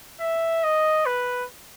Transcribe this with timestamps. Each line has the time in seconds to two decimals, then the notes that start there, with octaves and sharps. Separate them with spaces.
0.20 E5
0.64 D#5
1.06 B4